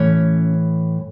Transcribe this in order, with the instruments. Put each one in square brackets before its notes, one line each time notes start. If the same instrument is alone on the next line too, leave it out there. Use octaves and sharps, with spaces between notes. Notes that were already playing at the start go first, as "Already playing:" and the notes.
Already playing: [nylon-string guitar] A2 E3 C#4 C#5